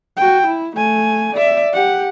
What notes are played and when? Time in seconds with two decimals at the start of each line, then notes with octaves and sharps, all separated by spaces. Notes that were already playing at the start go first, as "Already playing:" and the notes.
0.17 F#4 G5
0.46 E4
0.75 A3 G#5
1.34 D5 E5
1.73 G4 F#5